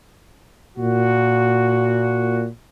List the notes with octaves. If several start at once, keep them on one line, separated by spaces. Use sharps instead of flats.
A#2 F#4